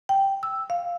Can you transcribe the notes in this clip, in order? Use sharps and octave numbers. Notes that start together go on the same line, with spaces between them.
G5
E6
F5